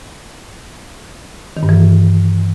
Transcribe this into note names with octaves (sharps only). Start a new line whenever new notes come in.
D#3
G2
E3